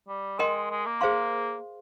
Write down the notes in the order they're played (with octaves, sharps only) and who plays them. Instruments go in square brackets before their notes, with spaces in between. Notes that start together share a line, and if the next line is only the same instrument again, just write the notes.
[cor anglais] G3
[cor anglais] G#3 [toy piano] A#4 D#5 G5 C6
[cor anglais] G#3
A#3
[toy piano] G#4 C5 F5 C6